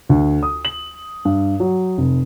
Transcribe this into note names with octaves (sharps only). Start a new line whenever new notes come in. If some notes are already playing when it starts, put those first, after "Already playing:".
D2
D#6
F#7
G2
F#3
F1